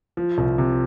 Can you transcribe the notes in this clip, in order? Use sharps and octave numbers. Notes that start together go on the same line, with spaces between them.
F3
C2
C3